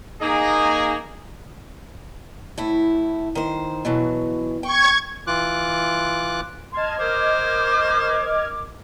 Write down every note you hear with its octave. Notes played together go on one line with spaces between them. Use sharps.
A#3 D#4 G#4
A2 E4
D#3 C5
B2 E3 F#3
G5 C#6 G#6
E3 F4 D6 F#6
D#5 A5 C6 F6 G#6
A#4 C5 D6